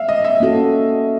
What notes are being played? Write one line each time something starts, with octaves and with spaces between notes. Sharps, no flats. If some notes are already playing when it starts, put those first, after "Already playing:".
Already playing: E5 F5
D#5
E5
A#3 C#4 F#4 A4